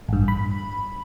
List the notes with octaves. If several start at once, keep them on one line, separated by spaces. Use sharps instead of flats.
A1 G2
B5